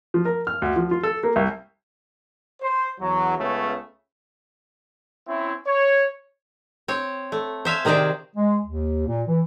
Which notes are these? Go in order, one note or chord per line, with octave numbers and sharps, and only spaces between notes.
F3
A#4
F6
D2
F3
F4
A4
A#3
C2
C5
E2 F#3
C#2 C#3 A3 B3 C#4
C4 C#4 E4
C#5
C4 C#5
A3
C5 E5 F5 G#5
C3 D#3 G#4 C5 D5 G5
G#3
D#2
A#2
E3